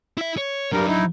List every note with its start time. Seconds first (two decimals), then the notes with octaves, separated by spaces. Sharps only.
0.18 E4 E5
0.37 C#5
0.72 G2 F#3 G3 D4 A#4
0.87 D#4 E4